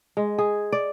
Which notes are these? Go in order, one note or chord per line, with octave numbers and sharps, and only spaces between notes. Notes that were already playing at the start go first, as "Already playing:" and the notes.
G#3
G#4
D5